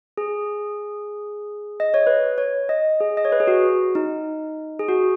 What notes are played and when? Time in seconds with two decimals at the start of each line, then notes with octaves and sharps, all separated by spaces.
0.17 G#4
1.80 D#5
1.94 C#5
2.07 B4
2.38 C#5
2.69 D#5
3.00 G#4
3.17 D#5
3.25 C#5
3.32 B4
3.40 G#4
3.47 F#4
3.95 D#4
4.79 G#4
4.88 F#4